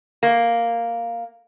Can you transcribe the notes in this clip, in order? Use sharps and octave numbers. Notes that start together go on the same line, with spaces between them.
A#3